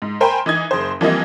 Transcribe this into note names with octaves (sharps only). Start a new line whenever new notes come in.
G#2
A#4 C5 G5 G#5 A#5 B5
E3 D#4 D#6 G#6
F#1 C5
E3 F3 G3 A#3 C4 D#5